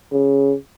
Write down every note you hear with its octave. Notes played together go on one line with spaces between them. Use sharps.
C#3